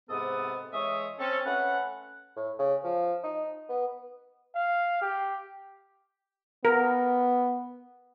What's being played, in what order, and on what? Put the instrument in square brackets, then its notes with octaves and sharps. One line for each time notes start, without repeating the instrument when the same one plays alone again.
[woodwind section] G#2 C3 B3 A4 D#6
E3 G#3 C#5 E5 D#6
C4 C#4 A4
A3 C#4 B4 F#5
[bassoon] A2
C#3
F3
D#4
B3
[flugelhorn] F5
G4
[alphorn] B3 [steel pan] A#4